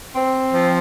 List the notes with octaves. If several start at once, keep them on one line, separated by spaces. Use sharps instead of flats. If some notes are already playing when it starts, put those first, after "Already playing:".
C4
F3